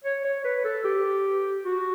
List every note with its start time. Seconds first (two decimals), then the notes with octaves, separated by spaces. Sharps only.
0.04 C#5
0.24 C#5
0.44 B4
0.64 A4
0.84 G4
1.64 F#4